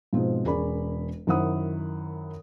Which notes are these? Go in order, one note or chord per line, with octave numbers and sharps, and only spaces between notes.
G#2 B2 F3 G#3 C4
E1 C#4 G#4 A#4 D5 B5
F#2 D#3 E4 C5 F#5 D#6